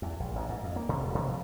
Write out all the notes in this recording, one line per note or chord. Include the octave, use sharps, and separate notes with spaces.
E2
A#1
A1
G#2
F2
A#3
C3
E1
C3
F3